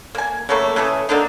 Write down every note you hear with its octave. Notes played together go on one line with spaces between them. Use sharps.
A#3 G#5
C#3 F#3 A3 A#3
C#3 E3 A3 G#4
D3 A#3 D4 D#4